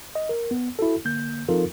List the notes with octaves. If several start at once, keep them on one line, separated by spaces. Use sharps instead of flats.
D#5
A#4
B3
E4 F#4 A4
D3 A#3 G6
F3 C4 D#4 F4 A4 A#4